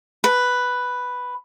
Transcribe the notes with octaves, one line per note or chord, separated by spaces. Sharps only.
B4